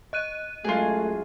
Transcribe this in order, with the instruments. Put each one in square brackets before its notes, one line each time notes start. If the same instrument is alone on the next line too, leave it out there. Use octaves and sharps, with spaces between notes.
[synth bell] D#5 F#6 D#7
[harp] F#2 G#3 A#4 [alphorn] A3 [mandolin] F4 G#4